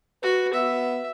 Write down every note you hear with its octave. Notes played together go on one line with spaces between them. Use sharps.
F#4 B4
B3 E5